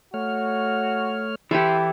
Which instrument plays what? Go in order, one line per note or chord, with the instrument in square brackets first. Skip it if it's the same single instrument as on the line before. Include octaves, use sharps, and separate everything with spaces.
[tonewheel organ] A3 C#5 F6 [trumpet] F#4
[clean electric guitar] E3 E4 [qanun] G4 A4 [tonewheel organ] E5 C6